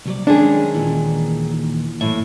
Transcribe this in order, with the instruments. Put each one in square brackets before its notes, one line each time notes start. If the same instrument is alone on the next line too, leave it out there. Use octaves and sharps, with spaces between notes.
[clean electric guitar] C2 F#3 D5
[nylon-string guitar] D#3 G#3 G#4 [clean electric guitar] C#4 [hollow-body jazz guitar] D4
[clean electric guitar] D#2 A#2 E3
[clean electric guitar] F#2 E3 E5 [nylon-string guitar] A2